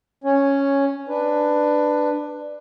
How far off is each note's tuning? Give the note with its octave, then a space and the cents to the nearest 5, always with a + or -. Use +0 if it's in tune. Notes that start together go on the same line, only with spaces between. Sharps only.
C#4 +0 C#5 +0
D4 +15 B4 +5